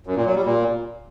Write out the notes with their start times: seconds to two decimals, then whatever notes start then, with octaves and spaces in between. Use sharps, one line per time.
0.07 F#2
0.16 A#2
0.26 F#3
0.35 G3
0.45 A#2